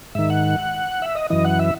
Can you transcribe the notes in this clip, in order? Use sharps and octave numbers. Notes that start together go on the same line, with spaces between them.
G#2 D#3 E5
F#5
E5
D#5
F#2 E3 D#5
F#5
E5